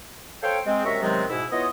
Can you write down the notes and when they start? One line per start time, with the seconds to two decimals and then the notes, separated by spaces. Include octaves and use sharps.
0.42 A4 C5 C#5 F5 G5
0.66 G#3 C4
0.85 F#2 C3 G#3 E5 A#5 C#6
1.02 C3 D#3 F#3 G#3 B3 C4
1.29 G#2 B2 E4
1.52 B3 E4 F4 C#5 D#5